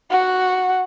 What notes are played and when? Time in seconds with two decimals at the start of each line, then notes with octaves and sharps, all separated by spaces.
0.11 F#4 F#5